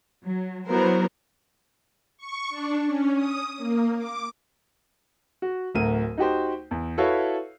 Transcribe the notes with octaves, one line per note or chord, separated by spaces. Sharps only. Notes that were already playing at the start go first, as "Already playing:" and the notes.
F#3
F#3 B3 E4 F#4 A#4 C5
C#6
D4
C#4
D#6
A#3
D6
F#4
D1 D2 A#4 D#7
D#4 F#4 G4 C5
E2
E4 F#4 A4 B4 C#5 F5